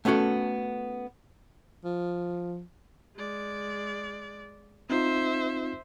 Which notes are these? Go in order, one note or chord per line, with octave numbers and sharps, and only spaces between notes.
A3 B3 C#4 F#4 A4
F3
G#3 D5
C4 D#4 F4 C5 E5